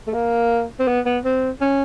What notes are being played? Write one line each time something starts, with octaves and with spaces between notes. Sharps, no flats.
A3
A#3
C4
B3
B3
C4
C#4